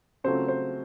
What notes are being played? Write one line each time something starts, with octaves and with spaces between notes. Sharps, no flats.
C#3 F#3 A3 C4 F4 C5
C5